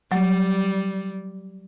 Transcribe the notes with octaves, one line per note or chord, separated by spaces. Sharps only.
F#3 G3